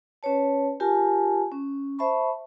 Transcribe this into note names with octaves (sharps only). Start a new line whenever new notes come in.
C#4 B4 C#5 A5
F4 G4 A#4 G#5 A5
C#4
C5 E5 A5 B5 C#6